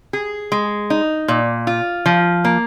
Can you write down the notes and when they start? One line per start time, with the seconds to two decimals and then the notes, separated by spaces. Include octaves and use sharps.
0.13 G#4
0.52 G#3
0.90 D#4
1.28 A#2
1.67 F4
2.06 F3
2.45 A#3